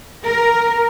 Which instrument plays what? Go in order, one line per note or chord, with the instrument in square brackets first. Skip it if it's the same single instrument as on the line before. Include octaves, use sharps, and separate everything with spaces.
[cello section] A#4